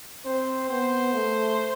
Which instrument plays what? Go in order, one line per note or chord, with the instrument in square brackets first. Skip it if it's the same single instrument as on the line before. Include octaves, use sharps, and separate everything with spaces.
[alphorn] C4 [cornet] C5
[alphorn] B3 [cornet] C5
[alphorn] A3